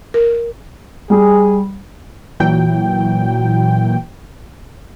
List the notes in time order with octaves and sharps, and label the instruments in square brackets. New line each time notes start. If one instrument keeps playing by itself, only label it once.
[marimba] A#4
[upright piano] G3 [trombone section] G#4
[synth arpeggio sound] A#2 E3 F#3 G5